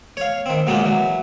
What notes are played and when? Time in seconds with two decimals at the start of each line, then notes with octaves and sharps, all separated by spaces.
0.17 C#5 F5
0.46 D#3 C4
0.67 A#2 F#3 G#3 A#3 D#4 F4
0.84 E3 F#3